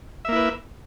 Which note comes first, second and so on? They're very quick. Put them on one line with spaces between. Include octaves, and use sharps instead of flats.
E5 A#3 E4 B4